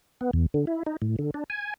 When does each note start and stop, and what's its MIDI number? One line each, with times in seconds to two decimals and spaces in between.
0.21 0.31 59
0.33 0.46 40
0.54 0.65 50
0.67 0.83 64
0.86 0.97 63
1.02 1.16 45
1.19 1.31 50
1.34 1.44 62
1.50 1.74 80